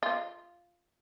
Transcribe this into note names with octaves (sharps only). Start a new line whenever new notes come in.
F4